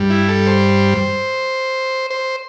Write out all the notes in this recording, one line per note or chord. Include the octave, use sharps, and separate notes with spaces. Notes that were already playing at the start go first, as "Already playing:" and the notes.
Already playing: G2 G3
E4
A4
C5
C5